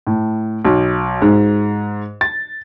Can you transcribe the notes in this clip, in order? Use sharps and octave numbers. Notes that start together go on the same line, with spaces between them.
A2
B1
G#2
A6